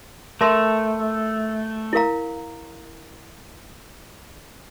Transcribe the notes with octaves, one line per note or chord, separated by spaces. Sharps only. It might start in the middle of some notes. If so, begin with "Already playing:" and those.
A3 A#4 E5 A5 C6
E4 A#4 F5 A#5